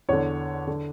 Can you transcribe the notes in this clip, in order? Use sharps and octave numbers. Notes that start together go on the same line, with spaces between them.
E2 D3 C#5
D3